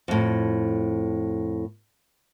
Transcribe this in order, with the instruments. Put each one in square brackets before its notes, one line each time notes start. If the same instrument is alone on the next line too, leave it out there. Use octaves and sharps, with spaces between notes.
[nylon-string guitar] F2 A2